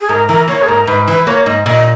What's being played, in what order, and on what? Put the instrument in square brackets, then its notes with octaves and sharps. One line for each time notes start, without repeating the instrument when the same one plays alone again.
[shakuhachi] G#4
[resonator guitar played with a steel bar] G#2 [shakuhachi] A#4
[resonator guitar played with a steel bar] E3 [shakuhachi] A#4
[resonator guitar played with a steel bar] A#3 [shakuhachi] C#5
[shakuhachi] G#4
[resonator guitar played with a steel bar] G#2 [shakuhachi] A#4
[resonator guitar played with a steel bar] G#2 [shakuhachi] B4
[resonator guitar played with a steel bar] E3 [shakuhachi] B4
[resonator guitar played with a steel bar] A#3 [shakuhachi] C#5
[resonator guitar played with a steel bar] G#2 [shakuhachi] D#5
[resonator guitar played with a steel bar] A#2 [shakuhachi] D#5